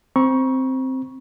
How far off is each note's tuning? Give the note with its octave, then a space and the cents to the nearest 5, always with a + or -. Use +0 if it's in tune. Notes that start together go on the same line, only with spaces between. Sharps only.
C4 +0 A#5 +40 C#6 +0